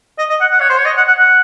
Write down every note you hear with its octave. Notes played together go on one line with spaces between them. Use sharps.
D#5
D#5
F#5
F#5
C#5
C5
C#5
D#5
F#5
F#5
F#5